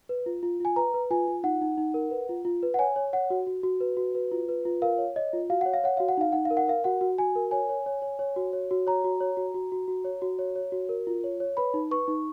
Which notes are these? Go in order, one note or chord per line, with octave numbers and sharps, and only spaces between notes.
B4
F4
F4
F4 G#5
B4 A#5
B4
F4 G#5
F4
D#4 F#5
D#4
D#4
A#4
B4
F4
F4
B4
F#5
C#5 G#5
C#5
C#5 F#5
F#4
F#4
F#4
B4
F#4
B4
F4
B4
F4
A#4 F5
C#5
C#5 D#5
F4
F#4 F5
C#5 F#5
F5
C#5 F#5
F#4 F5
F#5
D#4 F5
D#4 F#5
F5
A#4
F#5
A#4 F5
F#4 F#5
F#4
F#4 G#5
A#4
C#5 G#5
C#5
C#5
C#5
C#5
F#4
C#5
F#4
C#5 A#5
F#4
C#5
F#4
F#4
F#4
F#4
C#5
F#4
C#5
C#5
F#4
A#4
F4
C#5
C#5
B4 B5
D#4
B4 C#6
D#4